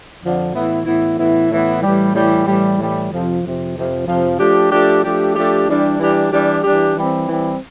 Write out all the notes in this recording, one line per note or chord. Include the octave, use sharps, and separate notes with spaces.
F2 D3 F3
A2 E3 B3 E4
A2 E3 B3 E4
A2 E3 B3 E4
A2 E3 B3 E4
A2 E3 G3
A2 E3 G3
A2 E3 G3
A2 E3 G3
F2 C3 F3
F2 C3 F3
F2 C3 F3
F2 C3 F3
F3 A3 D4 G4
F3 A3 D4 G4
F3 A3 D4 G4
F3 A3 D4 G4
E3 G3 D4 G4
E3 G3 D4 G4
E3 G3 D4 G4
E3 G3 D4 G4
E3 G3 C4
E3 G3 C4